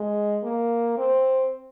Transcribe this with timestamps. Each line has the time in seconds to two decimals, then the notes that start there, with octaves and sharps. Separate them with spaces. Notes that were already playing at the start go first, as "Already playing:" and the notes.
Already playing: G#3
0.43 A#3
0.97 C4